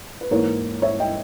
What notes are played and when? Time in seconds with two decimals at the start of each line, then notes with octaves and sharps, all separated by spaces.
0.21 B4
0.31 G#2 E3 A#3 A#4 C#5
0.82 C#5 E5
1.00 D#5 G5